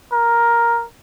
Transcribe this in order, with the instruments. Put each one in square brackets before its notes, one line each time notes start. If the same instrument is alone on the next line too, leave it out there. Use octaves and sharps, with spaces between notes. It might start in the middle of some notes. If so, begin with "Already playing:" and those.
[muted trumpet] A#4